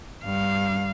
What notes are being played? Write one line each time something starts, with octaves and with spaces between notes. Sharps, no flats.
G2 F5